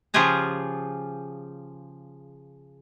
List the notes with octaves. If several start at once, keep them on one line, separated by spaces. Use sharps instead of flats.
C#3 F3 F4 G4 G#4 A#5